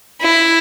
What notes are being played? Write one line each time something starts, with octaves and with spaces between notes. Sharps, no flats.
E4